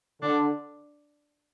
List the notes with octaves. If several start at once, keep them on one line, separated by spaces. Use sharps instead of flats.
D3 D4